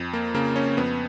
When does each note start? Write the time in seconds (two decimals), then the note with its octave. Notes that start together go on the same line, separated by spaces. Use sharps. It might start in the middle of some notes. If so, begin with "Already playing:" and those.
Already playing: F2
0.13 A#3
0.34 C#3 A#3
0.56 C#4
0.77 F2 B3